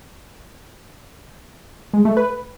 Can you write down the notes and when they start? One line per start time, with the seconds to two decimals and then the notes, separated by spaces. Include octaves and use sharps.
1.94 G#3
2.05 A3
2.17 B4